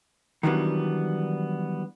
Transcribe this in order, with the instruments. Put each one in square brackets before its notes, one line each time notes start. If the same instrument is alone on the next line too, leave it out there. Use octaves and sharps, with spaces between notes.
[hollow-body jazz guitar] D#3 E3 F#3 G3 B3 D4